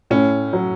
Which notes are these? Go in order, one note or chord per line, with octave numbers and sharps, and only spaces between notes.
A2 C#4
F#3